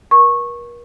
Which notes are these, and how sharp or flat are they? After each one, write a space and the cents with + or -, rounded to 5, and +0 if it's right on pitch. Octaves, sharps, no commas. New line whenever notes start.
A#4 +40 C#6 -15